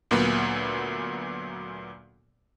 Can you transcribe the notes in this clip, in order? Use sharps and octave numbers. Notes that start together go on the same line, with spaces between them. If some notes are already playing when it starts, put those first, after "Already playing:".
D2 A#2 F#3 A#3 B3